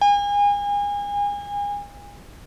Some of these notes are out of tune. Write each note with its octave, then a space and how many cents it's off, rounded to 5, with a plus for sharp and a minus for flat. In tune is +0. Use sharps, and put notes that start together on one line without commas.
G#5 -35